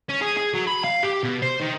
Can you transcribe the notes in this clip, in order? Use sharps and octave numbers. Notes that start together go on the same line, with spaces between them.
C#4
G#4
G#4
F#3
B5
F5
G4
B2
C5
D#3